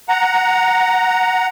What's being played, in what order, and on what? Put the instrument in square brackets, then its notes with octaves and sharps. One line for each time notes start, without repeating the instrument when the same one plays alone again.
[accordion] F#5 A#5